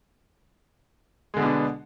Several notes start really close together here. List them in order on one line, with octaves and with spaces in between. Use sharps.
G#3 D3 B2 B3 D4